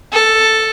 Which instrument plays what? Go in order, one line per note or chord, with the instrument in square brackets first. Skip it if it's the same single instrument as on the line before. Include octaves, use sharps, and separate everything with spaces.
[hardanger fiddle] A4